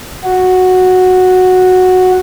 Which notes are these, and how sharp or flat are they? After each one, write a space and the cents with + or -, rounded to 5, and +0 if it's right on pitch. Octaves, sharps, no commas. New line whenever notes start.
F#4 -5